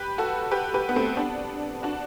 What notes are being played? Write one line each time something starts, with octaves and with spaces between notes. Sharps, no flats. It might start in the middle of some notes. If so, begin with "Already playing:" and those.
Already playing: G4 B4
F#4 A4
G4 B4
G4 B4
B3
A3 C4
B3 D4
D4 F#4